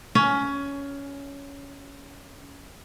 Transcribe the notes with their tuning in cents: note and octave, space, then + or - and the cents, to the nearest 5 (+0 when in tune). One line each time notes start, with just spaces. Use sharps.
C#4 +15